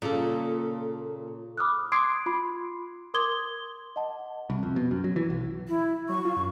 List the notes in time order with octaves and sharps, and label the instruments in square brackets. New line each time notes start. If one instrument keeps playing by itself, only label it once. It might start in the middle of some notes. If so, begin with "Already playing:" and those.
[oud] A#2 [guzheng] C#3 A4
[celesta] B5 D6 D#6 F6 F#6
C6 D6 D#6 G#6 C7 D7
F4 B5 C6
A#4 C6 D6 D#6 G#6 G7
D#5 F#5 A5
[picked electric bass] C2
F2
B2
F#2
F#3
E3
B1
[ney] E4
[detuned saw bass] F#3 [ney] C#6
[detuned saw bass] F4
F#2